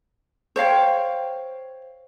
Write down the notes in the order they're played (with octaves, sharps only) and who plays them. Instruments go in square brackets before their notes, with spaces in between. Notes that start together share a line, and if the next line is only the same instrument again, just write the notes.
[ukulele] C5 C#5 F5 G5